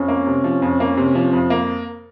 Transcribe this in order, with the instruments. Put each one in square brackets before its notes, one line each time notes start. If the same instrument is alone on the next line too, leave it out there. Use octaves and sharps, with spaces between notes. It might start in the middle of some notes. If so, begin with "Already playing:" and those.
Already playing: [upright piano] F2 [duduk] C#4
[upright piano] A#3
C3
F3
F2
A#3
C3
F3
F2
A#3